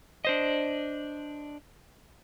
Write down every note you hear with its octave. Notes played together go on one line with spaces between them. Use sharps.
D4 C5 D#5